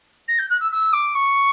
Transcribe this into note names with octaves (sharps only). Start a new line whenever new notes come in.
A#6
G6
F#6
E6
E6
D6
C#6